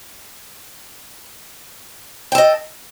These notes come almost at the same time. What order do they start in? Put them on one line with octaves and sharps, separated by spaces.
G5 A4 D#5